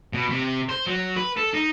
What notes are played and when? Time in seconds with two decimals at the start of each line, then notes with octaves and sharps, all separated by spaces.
0.13 B2
0.30 C3
0.69 C5
0.86 F#3
1.16 B4
1.37 A4
1.54 D#4